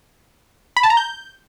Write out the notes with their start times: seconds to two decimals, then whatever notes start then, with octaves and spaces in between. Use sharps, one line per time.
0.77 B5
0.83 A5
0.90 A#5
0.97 G6